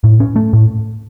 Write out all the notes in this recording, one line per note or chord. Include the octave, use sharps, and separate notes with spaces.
A2
C#4
A3
A2